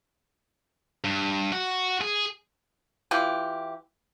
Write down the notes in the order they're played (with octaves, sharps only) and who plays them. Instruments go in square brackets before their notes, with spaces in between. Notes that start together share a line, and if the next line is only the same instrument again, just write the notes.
[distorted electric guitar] G2
F#4
G#4
[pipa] E3 F4 G4